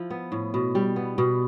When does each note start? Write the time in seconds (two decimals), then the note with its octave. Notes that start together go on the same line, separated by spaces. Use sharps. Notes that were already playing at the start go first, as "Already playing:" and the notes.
Already playing: F3 E4
0.10 B3
0.32 A2
0.54 B2
0.75 G3
0.96 B3
1.18 B2